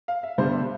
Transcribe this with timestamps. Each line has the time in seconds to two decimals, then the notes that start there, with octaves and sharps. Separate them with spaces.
0.08 F5
0.23 E5
0.38 G2 D3 G3 B3 C5
0.52 E5